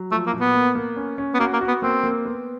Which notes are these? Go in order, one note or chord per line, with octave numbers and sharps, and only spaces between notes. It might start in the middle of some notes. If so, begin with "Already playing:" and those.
Already playing: F#3
F3 A3
A#3
A#2
B3
A#3
A#3
C#4
C#4
B3
A#3 F#4
A#3
F#4
B3
A#3 C4
A#3
B3